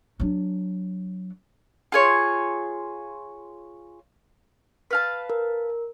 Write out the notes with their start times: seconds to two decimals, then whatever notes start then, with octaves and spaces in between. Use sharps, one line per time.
0.20 F#3 D4
1.92 F4 G#4 C#5
4.91 B4 F5 A5
5.30 A#4